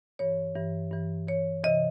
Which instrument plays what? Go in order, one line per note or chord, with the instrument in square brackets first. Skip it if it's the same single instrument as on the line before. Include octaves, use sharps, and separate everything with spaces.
[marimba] G2 E3 C#5
G2 E3
G2 E3
G2 E3 C#5
C3 E3 D#5